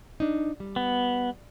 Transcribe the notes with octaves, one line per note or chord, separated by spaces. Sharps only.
D4 D#4
G3
B3